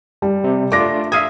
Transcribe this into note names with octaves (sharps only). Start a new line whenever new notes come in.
G3
C3
A3 D4 F4 D6 A#6
E5 F5 D#6 G#6 D#7